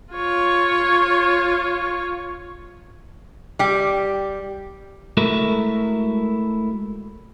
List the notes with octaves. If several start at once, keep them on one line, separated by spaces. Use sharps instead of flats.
F4 C#5
G3 G4
G#3 A3 E4 F#4 A4 A#4